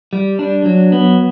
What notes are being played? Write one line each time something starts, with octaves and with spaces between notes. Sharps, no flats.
G3
D4
F#3
B3